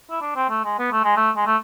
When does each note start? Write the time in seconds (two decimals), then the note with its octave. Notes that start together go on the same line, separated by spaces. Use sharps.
0.11 E4
0.21 D4
0.36 C4
0.50 A3
0.64 G#3
0.79 B3
0.92 A3
1.04 G#3
1.17 A3
1.36 G#3
1.46 A3